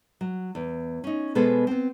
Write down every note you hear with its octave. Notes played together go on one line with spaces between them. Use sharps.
F#3
E2
C#4 D#4
B2 G#3 B3 G#4 A4 C5
B3 C4